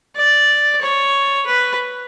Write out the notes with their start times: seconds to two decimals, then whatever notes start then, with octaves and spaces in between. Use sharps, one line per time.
0.16 D5
0.82 C#5
1.47 B4